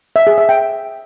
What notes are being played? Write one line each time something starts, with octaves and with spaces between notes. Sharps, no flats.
E5
G#4
E5
G5